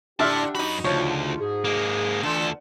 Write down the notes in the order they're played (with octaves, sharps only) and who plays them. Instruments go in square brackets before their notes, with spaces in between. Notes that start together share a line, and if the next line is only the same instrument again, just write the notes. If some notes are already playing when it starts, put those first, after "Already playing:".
[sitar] D3 [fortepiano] D4 E5 F6 [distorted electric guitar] E4 A5 [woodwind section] G4
[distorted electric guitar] F#2 B5 [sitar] D#4 F#4
[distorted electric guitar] D2 [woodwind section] C#3 F4 [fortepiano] F3 C#5
[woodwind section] G#2 G#4
[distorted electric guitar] G#3 A#3
[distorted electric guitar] D2 A4 [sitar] D3 [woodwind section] E3 F4